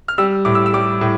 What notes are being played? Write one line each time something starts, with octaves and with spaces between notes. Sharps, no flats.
F6
G3 E6
A2 D6
E6
E6
G3 D6
A2